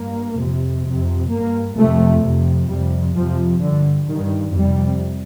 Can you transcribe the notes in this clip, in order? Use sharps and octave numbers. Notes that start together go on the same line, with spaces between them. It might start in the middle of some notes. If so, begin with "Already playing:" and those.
Already playing: G2 A#3
F2 C3
F2 C3
G2 A#3
F2 C3 A3
F2 C3
F2 C3 G3
F2 C3 F3
G2 D3
G2 D#3
F2 C3 G3